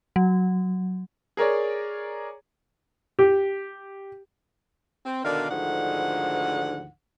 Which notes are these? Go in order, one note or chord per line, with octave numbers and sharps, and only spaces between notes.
F#3
G#4 A#4 C#5 D5
G4
C4
B2 D3 D#3 A#4 D5 F5
D2 G#2 D3 D#3 F3 F#5